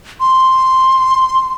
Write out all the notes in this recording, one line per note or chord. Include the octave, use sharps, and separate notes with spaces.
C6